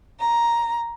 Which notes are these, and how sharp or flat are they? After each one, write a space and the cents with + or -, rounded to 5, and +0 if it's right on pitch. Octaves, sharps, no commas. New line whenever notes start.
A#5 +10